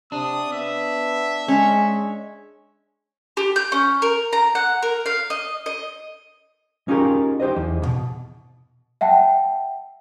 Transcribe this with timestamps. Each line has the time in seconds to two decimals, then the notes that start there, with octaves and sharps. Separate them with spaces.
0.12 C3 D4 D#6
0.52 B3 E5
1.48 G#3 C#4
3.37 G4
3.56 G6
3.72 C#4
4.02 A#4
4.33 A#5
4.55 F#5
4.83 A#4
5.06 F5
5.30 D#5
5.66 D#5
6.88 C#4 D#4 F4 G4 G#4 A#4
7.40 D#4 G4 C5 D#5
7.56 E2
7.82 E2 B2
9.01 E5 F#5 G5 A5